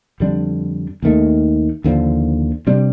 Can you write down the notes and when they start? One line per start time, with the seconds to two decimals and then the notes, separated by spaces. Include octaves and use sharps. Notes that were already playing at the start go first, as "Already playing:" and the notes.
0.20 F2 D3 G3 D4
1.03 D#2 D#3 A3
1.84 D#2 D3 F3
2.67 C3 G3 D4